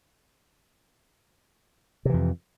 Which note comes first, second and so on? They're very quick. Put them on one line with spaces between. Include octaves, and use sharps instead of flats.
C3 E3 F2